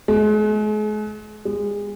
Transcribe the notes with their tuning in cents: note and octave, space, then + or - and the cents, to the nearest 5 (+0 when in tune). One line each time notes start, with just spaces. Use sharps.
G#3 +40
G#3 -25